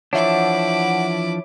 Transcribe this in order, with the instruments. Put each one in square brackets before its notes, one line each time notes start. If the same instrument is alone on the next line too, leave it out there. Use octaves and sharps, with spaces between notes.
[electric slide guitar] E3 F3 D4 [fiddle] E4 D6 [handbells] C#5 E5 [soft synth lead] F#5